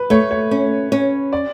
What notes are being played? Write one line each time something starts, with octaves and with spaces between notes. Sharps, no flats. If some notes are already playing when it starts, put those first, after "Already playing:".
Already playing: B4
A3 C#5
C#5
C#4
C#4
D5